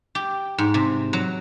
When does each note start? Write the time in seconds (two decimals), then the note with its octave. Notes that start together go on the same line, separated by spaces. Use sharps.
0.15 G4
0.58 G#2
0.74 C3
1.13 F#3